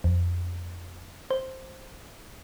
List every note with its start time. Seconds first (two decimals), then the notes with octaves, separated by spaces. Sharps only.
0.04 F2
1.31 C5